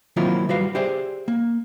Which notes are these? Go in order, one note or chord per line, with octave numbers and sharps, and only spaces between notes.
D#3 F#3 A#3 C4 E4 F4
G3 F#4 B4 F5
G4 G#4 C5 D5 E5
A#3